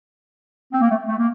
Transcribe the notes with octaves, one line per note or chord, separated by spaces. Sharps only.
C4
A#3
A3
A3
A#3